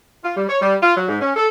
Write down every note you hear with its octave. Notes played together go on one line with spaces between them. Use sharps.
F4
G3
C#5
G3
F4
F#3
G#2
C#4
A4